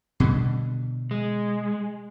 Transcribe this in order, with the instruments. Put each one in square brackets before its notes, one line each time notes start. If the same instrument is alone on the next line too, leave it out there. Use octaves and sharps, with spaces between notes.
[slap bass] B2 D3 G3
[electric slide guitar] G#3